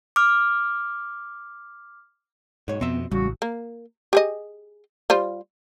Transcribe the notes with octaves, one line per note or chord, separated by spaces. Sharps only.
D6 F6
B1 G#2 C#5
F2 B2 B3 C4 E5
A1 C#3 G3 F#4
A#3
G4 G#4 D#5
G3 F4 C5